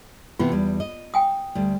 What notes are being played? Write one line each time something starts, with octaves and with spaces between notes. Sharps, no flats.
C3 E3 B3 F4
E2 G3
D#5
G5 G#5 D#6
D2 G3